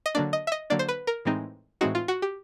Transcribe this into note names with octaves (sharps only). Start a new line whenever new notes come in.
D#5
D3 F#3 A#3 D4 D5
D#5
E5
D#5
D3 F#3 A#3 D4 D5
C5
B4
A#4
A2 E3 G#3 C4 D#4
A2 E3 G#3 C4 D#4 F#4
F4
F#4
G4